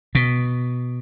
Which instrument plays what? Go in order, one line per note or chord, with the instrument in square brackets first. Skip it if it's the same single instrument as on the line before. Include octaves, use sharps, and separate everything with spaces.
[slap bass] B2